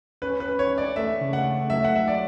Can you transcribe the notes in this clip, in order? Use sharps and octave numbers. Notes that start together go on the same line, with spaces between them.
C#4 B4
B4
C#4
C#5
C#4
D5
A3 E5
C#3
F#5
A3
F#3 E5
F#5
F#3 E5
D5